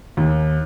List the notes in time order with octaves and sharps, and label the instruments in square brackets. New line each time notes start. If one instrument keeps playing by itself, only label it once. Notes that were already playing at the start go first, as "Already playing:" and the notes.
[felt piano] D#2